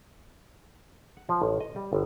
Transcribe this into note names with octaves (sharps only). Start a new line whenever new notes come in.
F#5
F3
A1
D#5
G3
G1